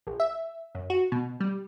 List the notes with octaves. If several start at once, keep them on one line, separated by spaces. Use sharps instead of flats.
A#1
E5
F#2
F#4
B2
G3